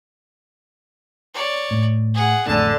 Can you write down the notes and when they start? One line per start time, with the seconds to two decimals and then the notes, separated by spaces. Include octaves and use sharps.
1.34 C#5 D5
1.71 A2
2.14 G#4 F#5
2.47 A1 F2 D3 A3 A5